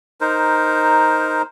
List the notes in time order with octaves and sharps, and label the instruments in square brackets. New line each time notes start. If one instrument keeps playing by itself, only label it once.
[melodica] D#4 A#4 C5